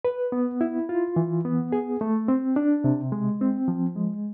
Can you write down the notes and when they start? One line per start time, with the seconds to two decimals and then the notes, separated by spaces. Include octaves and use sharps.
0.05 B4
0.32 B3
0.61 E4
0.89 F4
1.16 E3
1.45 B3
1.72 G#4
2.01 A3
2.28 C4
2.56 D4
2.84 C3
3.12 G#3
3.41 C4
3.68 F3
3.96 G#3